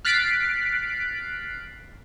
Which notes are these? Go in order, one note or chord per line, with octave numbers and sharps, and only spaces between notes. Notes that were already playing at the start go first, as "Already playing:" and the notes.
F6 F#6 A6 B6 C7 D7